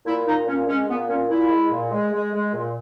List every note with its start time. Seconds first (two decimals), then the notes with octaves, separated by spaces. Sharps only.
0.06 A#2 E4
0.26 A#2 D#4
0.47 A#2 C#4
0.67 G#3 C#4
0.88 A#2 B3
1.08 A#2 C#4
1.29 A#2 E4
1.50 G#3
1.70 A#2
1.91 G#3
2.12 G#3
2.32 G#3
2.53 A#2